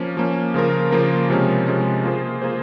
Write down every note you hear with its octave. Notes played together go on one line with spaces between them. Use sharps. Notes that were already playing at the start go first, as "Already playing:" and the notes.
Already playing: F3 A#3 C#4
F3 A#3 C#4
C#3 F3 A#3 F4 A#4
C#3 F3 A#3 F4 A#4
C3 F3 G#3 C#4
C3 F3 G#3 C#4
A#3 F4 G#4 C5
A#3 F4 G#4 C5